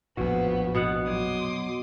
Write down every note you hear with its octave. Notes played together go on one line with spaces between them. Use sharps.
A#1 F2 A2 F3 B3 F#4
B2 B3 F#5
F#3 C6 D6 D#6